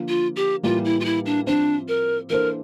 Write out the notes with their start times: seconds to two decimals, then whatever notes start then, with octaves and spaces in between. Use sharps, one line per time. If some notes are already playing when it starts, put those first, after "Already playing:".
Already playing: D3 F3 A#3
0.08 F4
0.36 G4
0.63 A2 E3 G3 A#3 F4
0.85 E4
1.00 F4
1.05 E4
1.26 D4
1.47 F3 C4 D4 F4 C5
1.88 A#4
2.30 E3 A#3 D4 A4 A#4 C5